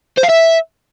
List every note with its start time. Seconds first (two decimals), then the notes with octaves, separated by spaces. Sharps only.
0.17 C5
0.23 F5
0.29 E5